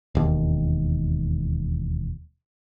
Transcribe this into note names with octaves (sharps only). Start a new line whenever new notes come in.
E1 D#2